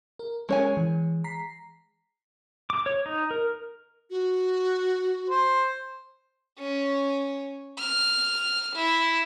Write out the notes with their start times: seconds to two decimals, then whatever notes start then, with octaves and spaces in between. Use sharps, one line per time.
0.19 A#4
0.49 G#3 C#4 A#4 C#5 G#5
0.77 E3
1.24 A#5 B6 C7
2.70 D6
2.86 C#5
3.06 D#4
3.31 A#4
4.09 F#4
5.29 C5
6.59 C#4
7.79 F6
8.75 E4